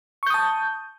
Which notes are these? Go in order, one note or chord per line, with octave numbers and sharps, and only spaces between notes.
A5 C#6 D#6 G6